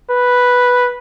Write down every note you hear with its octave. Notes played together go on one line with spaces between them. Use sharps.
B4